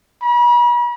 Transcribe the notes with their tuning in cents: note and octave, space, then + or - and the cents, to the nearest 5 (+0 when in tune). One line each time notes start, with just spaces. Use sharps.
B5 -45